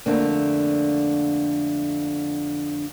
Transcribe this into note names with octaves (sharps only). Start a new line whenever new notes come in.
F2 D3 A3 A#3 C4 D4